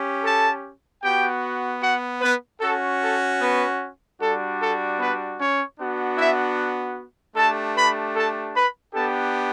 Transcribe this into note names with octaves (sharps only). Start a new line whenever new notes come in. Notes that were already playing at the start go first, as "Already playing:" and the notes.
Already playing: C#4 G4
A4 A5
B3 F#4 G4 G5
F#4 F#5
B3 B4
C#4 F#4 A4
A4
B3 B4
G3 D4 F#4 A4
A4
B3 B4
C#4 C#5
B3 D4 F#4
E4 E5
A3 D4 G4 A4 A5
B4 B5
A4 A5
B4 B5
B3 D4 G4 A4 A5